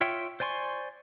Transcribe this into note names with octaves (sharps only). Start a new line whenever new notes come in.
F4 C#5 E5 G5
C5 D5 G#5 C6 C#6